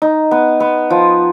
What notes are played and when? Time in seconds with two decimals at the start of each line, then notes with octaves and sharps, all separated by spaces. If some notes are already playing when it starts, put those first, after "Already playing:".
0.02 D#4
0.31 B3
0.60 B3
0.90 F3